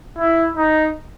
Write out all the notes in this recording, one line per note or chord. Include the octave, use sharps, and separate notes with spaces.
E4
D#4